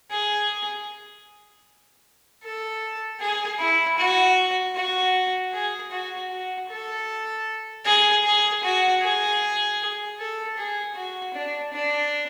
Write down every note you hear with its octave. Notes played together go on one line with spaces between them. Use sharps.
G#4
A4
G#4
E4
F#4
F#4
G#4
F#4
F#4
A4
G#4
G#4
F#4
G#4
A4
G#4
F#4
D4
D4